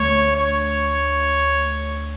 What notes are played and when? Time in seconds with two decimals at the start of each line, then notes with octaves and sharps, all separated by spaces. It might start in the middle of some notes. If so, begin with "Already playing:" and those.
Already playing: D2 D3 A3 D4 C#5
0.36 C#5